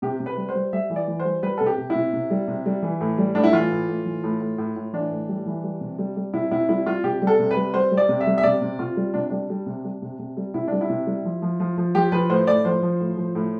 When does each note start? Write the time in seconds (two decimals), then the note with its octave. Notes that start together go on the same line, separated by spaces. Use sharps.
0.02 C3 G4
0.20 C3
0.26 B4
0.37 G3
0.49 C5
0.55 G3
0.73 G3 E5
0.90 E3
0.96 D5
1.08 E3
1.20 C5
1.25 G3
1.42 G3 B4
1.58 C3 A4
1.66 G4
1.78 C3
1.90 E4
1.95 C3
2.13 C3
2.30 G3
2.48 C3
2.66 G3
2.83 E3
3.01 A2
3.18 G3
3.35 A2 D4
3.44 E4
3.53 E3 F4
3.71 A2
3.88 A2
4.06 E3
4.23 A2
4.41 A2
4.58 A2
4.76 A2
4.93 E3 D4
5.11 A2
5.29 G3
5.46 E3
5.64 G3
5.81 C3
5.98 G3
6.16 G3
6.34 C3 E4
6.51 C3 E4
6.69 G3 E4
6.86 G3 F4
7.04 C3 G4
7.22 G3
7.27 A4
7.39 C3
7.51 B4
7.57 G3
7.74 G3 C5
7.91 G3
7.97 D5
8.09 C3
8.21 E5
8.27 G3
8.38 E5
8.43 C3 D5
8.62 C3
8.79 C3 F4
8.97 G3
9.14 C3 D4
9.30 G3 D4
9.50 G3
9.66 C3
9.84 G3
10.02 C3
10.19 C3
10.37 G3
10.54 C3 E4
10.68 G3 D4
10.81 E4
10.89 C3
11.07 G3
11.25 F3
11.42 F3
11.60 F3
11.77 F3
11.95 F3 G4
12.12 F3 B4
12.29 A2 C5
12.47 A2 D5
12.65 F3 C5
12.83 F3
13.00 A2
13.17 F3
13.35 A2